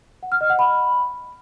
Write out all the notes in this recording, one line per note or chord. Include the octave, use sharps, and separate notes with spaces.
F#5
F6
D#5
F#5
B5